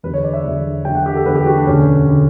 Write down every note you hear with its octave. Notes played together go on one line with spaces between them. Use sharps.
E2 D3 F#3 B4
C#5
D5
E5
E2 D3 F#3
E2 D3 F#3 G5
F#5
G4
A4
E2 D3 F#3 B4
G4
F#4
D4
E1 D2 D3 C#4
D3